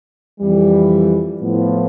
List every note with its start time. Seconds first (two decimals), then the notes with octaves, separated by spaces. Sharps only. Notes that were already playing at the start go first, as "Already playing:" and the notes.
0.40 F2 E3 G3
1.41 A2 F3 B3